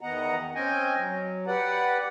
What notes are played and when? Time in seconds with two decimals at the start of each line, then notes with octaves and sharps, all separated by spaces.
0.01 E2 D#3 B3 D#5 F#5 A#5
0.55 C4 C#4 D#5 G5 G#5
0.97 F#3
1.47 G4 B4 D5 F#5